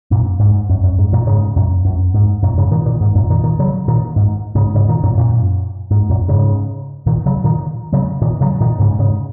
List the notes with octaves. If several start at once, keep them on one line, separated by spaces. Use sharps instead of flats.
F#2 A#2
G#2
F#2
F#2
G#2
F#2 A#2
G#2 C#3
F#2 A#2
F#2
G#2
F#2 A#2
G#2 C#3
A#2 D#3
A#2 D#3
G#2
F#2 A#2
A#2 D#3
A#2 D#3
C#3 F#3
A#2 D#3
G#2
G#2 C#3
G#2 C#3
A#2 D#3
F#2 A#2
F#2 A#2
G#2
F#2 A#2
G#2 C#3
A#2 D#3
C#3 F#3
A#2 D#3
C#3 F#3
A#2 D#3
C#3 F#3
A#2 D#3
G#2 C#3
G#2 C#3